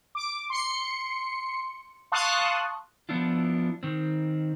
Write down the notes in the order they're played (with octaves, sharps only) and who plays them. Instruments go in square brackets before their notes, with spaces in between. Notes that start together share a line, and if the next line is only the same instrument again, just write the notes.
[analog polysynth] D6
C6 C#7
F5 A5 C6 C#6 D#6 F#6
[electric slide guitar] F3 B3 D4 E4 F4
D#3 C4